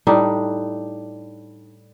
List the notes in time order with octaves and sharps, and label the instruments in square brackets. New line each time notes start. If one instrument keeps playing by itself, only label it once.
[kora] A2 G3 D4 D#4